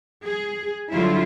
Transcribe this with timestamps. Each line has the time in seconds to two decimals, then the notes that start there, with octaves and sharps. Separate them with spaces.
0.24 G#4
0.91 D3 F#3 G3 E4 F4